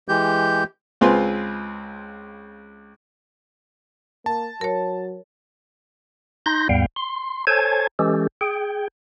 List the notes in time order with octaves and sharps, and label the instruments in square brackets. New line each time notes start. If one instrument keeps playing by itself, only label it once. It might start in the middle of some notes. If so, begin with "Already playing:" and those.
[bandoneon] E3 G#3 G4 G6
[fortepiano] C#2 C4 F4 G#4 B4 C6
[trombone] A#3 [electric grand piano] A5
[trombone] F#3 [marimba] A#4 C#5
[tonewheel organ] D#4 C6 G6 A#6
D#2 G#2 G3 B3 F5 G5
C6
A4 C5 C#5 G#5 A5 G#6
E3 G#3 C#4 G4 A4
G#4 G5